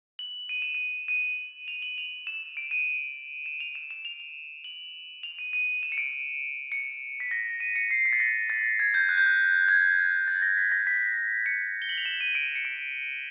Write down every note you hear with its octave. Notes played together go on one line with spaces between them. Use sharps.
F#7
D#7
E7
D#7
D#7
F7
F#7
F7
E7
D7
D#7
E7
F7
E7
E7
F7
F7
F#7
F7
D#7
D#7
E7
C#7
D7
C#7
B6
A#6
D#7
C#7
C7
B6
A6
A#6
A6
G#6
G6
F#6
G6
F#6
G#6
A6
A#6
B6
A#6
B6
C#7
G7
F#7
F7
E7
D#7
D7
C#7
D7